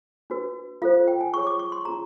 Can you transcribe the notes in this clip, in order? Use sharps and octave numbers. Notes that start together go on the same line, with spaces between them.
D4 F#4 B4
F4 A4 C5 F5
G5
G#5
F4 G#4 C#5 C#6
D6
C#6
C6
C#4 F4 G#4 A#5